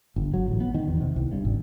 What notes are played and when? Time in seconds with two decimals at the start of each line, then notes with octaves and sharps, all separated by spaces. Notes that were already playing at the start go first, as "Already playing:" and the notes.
0.16 G1
0.34 F#3
0.48 A1
0.60 B3
0.74 D#3
0.88 E2
1.01 C3
1.16 C2
1.32 G2
1.45 G#1